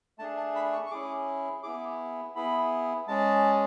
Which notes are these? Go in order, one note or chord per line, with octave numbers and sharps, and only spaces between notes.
A3 D4 G#4 A5
A5
B5
C#6
C#6
C#4 E4 G#4 D6
B3 E4 G#4 D6
B3 E4 G#4 B5
G#3 C#4 G#4 A5